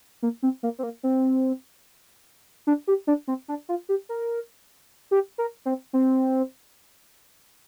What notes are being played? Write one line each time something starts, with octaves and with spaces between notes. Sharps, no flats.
A#3
C4
A#3
C4
A#3
C4
D4
G4
D4
C4
D4
F4
G4
A#4
G4
A#4
C4
C4